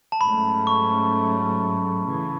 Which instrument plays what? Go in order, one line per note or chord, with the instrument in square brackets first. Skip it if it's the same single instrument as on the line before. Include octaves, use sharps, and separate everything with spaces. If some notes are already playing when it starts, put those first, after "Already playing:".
[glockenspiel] A5
[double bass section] G#2 F#3 A3 C#4 [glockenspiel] B5
[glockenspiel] C#6
[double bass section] C#3 E3